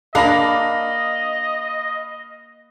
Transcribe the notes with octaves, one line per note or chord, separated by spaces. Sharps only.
A#3 D4 D#5 F5 B5 A#6